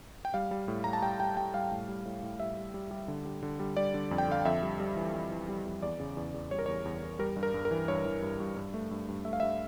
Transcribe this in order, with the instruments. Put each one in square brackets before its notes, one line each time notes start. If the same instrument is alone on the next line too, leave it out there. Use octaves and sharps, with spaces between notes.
[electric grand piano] G5
G3 F5
G3
A2
G3 A#5
A5
G3 G5
G3 G5
G3 G5
G3 F5
A2
G3
A2
A2
G3 E5
G3
G3
G3
D3
G3
D3
G3
G3 D5
D3
F2
G5
D3 F5
F2 E5
G3
G3
E3
G3
E3
G3
F2
E2 D5
C#3
E2
E2
G3 C#5
A#4
E2 C#5
E2
E2
G3 A#4
G2
A#4
G2
A#4
E3
G2 C#5
E3
G2
G2
G2
A3
G2
G2
A3 E5
F5
G2 E5